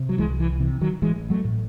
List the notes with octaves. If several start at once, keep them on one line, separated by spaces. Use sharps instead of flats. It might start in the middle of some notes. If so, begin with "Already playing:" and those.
Already playing: C3
F#3
C2 E3 G#3
E3
C3 E3
D#3 F#3
A1 E3 G#3
F#3 A3
A2